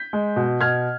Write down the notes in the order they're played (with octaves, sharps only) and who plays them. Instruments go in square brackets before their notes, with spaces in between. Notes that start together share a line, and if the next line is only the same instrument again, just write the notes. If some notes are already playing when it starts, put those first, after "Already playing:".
Already playing: [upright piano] G6 B6
G#3
B2
B2 F6 G#6